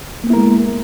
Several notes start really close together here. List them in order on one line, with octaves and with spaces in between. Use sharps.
A#3 B3 E4 A#4 G#3